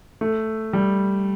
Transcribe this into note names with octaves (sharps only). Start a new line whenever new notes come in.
A3
G3